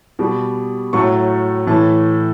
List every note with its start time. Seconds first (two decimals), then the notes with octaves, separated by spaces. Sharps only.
0.19 B2 G3
0.93 A2 F#3 A3 C#6
1.67 A2 E3 A3 A5